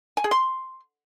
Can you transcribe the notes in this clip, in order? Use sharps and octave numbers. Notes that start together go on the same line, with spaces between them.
G#5
G#4
C6